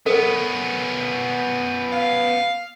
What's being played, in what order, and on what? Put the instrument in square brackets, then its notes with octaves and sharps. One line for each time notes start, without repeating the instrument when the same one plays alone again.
[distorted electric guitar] B3 C#4 [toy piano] A4 A#4
[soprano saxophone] F5